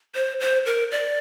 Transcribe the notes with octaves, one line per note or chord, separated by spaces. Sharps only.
C5
C5
A#4
D5